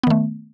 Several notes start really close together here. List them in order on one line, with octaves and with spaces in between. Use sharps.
B3 D#3 A3